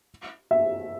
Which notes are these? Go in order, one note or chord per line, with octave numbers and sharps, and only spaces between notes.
E5